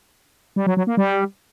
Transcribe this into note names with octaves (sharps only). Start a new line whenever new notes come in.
G3
F#3
F#3
A#3
G3